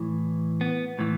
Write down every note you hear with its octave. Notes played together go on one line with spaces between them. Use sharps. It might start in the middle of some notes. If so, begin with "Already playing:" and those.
Already playing: A2 E3
B3
A2 E3